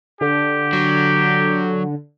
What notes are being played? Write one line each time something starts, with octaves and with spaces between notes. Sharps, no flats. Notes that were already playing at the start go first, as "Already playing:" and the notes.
D3 G4
F#3